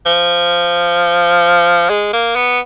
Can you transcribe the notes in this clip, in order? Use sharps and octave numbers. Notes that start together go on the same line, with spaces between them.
F3
G#3
A#3
B3